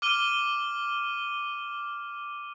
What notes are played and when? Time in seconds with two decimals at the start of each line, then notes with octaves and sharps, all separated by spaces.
0.02 D6 F6 D#7 G7